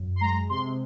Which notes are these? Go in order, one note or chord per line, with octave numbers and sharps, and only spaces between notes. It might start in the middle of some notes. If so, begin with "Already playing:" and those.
Already playing: F#2
C6
G#3 A#5
C3 C6